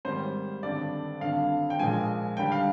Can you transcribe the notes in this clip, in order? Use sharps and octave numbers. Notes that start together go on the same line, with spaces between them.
G#1 G#2 D#3 G3 C5
G#1 G2 D3 D5
G#1 G2 D3 F5
G5
A#1 A#2 F3 G#3 G#5
D#2 D3 G3 G5
F5